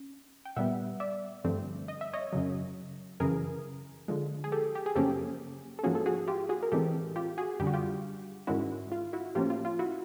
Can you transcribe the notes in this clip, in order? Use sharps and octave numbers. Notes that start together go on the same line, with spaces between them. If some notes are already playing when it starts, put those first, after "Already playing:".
Already playing: C#4
G5
A#2 G3 B3 E5 F#5
D5 E5
G2 D3 F3 A3 C4
D#5
E5
C#5 D#5
F#2 C#3 F#3
F#2 C#3 E3 G#4 A#4
D3 F3 G#3
G#4
G4 A4
G4
G#4
F#2 C#3 F3 A#3 C#4 G4 A4
A4
G#2 F3 A#3 C#4 F#4 G#4
A4
F#4 G#4
F4 G4
F#4 G#4
A#4
A2 E3 G#3 C4 G4 A4
F4 G4
F#4 G#4
F#2 D3 G3 G4
F#4
F4 G4
G#2 D#3 G#3 C#4 E4 F#4
F4
E4 F#4
A2 F3 A#3 C#4 F4 G4
F4
F4
E4 F#4